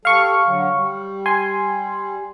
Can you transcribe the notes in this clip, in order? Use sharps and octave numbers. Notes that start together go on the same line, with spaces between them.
G3 A4 F5 C#6
D3 F#3
G3
G#5 C6